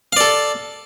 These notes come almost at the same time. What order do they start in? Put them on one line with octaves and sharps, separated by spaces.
F5 D5 A4